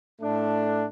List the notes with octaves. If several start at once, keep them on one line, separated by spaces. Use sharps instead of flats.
A2 A3 D4